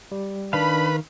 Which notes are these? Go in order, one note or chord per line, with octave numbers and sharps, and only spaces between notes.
G3
D#3 D4 B4 F5 B5